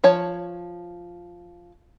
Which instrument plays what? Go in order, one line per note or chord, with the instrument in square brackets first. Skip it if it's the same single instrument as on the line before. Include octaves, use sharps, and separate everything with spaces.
[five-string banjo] F3 C#5 A5